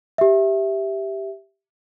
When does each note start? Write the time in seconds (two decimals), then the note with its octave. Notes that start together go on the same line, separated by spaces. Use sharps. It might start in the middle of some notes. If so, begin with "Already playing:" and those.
0.18 G4 E5